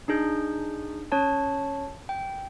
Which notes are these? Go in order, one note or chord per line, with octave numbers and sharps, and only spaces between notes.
D4 D#4 G#4 G6
C#4 C#5 A5
G5